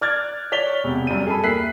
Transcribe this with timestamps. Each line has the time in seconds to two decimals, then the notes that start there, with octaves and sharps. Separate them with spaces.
0.01 D5 D6 F6 F#6 G#6 A6
0.52 C#5 D5 B6 F7 G7
0.84 E1 C3
1.07 F#2 G3 D#7
1.27 G#4 A4 B5
1.43 D#2 A#4 E5 F#6 B6 C7